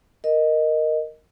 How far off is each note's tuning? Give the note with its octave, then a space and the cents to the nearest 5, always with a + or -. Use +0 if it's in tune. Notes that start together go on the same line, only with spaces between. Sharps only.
A#4 +0 D#5 +0